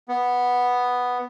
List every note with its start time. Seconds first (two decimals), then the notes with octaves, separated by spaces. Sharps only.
0.08 B3